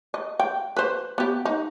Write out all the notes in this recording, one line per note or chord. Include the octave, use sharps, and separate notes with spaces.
D#5
G5
B4 C5
B3 G4
D#4